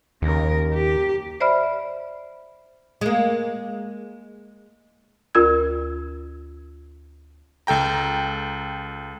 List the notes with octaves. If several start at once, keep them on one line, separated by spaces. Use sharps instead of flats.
D#2 C#3 A#4
G4
C5 D5 E5 B5 F6
G#3 A#3
D2 F4 A#4 E6 G#6
C#2 A4 G5 A#5